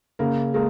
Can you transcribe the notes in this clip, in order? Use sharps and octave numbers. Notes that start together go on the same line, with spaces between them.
C#3 A#3
G#3 A#3